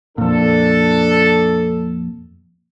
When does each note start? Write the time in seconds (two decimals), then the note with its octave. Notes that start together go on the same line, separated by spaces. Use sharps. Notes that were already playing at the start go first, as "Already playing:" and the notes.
0.18 F2 A#2 D4 A4